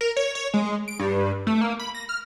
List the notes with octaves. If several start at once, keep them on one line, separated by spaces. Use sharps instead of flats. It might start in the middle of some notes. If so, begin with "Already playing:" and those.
A#4
C#5
C#5
G#3
D7
G2
A3
A#3
B5
A#6
F6